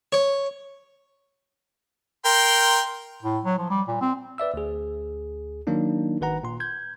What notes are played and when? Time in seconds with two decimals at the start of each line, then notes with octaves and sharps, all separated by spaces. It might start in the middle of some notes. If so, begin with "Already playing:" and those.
0.12 C#5
2.25 A#4 G5 C6
3.22 A2
3.44 F#3
3.58 F3
3.70 G3
3.88 A#2
4.01 C4
4.38 B4 D5 E5 E6
4.54 D2 G#4
5.67 D#3 F#3 A#3 D4 D#4
6.21 G#1 D#3 B4 F#5 A#5
6.43 A#2 C6
6.60 G6 G#6